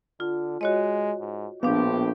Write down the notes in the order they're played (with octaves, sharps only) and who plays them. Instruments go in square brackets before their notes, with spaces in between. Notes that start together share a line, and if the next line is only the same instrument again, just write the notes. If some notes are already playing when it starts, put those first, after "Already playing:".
[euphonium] D3 [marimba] F4
[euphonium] G#3 [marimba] F#4 C#5 D#5
[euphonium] G#2
[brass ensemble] A#1 A2 G4 [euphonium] F3 [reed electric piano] B3 [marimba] D4 F5